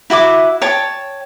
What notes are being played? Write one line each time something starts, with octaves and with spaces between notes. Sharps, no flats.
E4 F#4 E5 D6
C#5 G5 A5